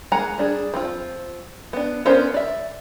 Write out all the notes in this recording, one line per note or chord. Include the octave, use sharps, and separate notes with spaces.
G#3 A#3 F#5 G#5 A#5
G3 D4 G#4
F3 C4 F4
B3 D4
B3 C#4 D4 A#4 C5
D5 E5